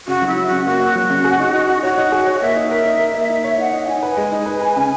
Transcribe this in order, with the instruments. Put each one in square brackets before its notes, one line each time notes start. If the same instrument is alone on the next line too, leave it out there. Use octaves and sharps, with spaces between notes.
[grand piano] C#3 [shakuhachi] F#4
[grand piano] F#3
[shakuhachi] E4
[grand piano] F#3
[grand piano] C#3 [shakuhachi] F#4
[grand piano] A#3 [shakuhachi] F#4
[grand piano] A#3
F#3
C#3
G#4
D#4
D#4
D#4
[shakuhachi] F#4 [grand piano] C#5
[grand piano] D#4
G#4
C#5
[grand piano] A#3 [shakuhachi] E5
[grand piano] D#4
A#4
D#4
A#4
A#3
D#4
C#5
[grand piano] D#4 [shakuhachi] F#5
[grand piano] D#4
[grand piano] D#4 [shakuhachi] G#5
[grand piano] B4
G#3
D#4
B4
B4
C#3